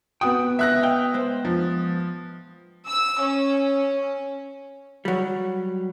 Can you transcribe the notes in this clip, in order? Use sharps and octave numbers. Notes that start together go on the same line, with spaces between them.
B3 F#4 G5 D#6
C#2 E5 F#6 A#6
D#5 F5 G5
G#3 B4 C5
F3
E6
C#4
F#3 G3